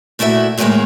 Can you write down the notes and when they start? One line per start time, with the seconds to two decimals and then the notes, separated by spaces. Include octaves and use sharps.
0.19 A#2 A3 E4 F#4 E5
0.58 E2 A2 D#3 F#3 G#3 A#3